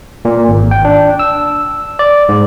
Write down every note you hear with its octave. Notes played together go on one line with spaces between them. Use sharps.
A#2
G#1
G5
D4
E6
D5
G#2